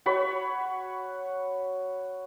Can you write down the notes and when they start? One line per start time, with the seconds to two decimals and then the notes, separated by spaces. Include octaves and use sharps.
0.06 F#4 C#5 B5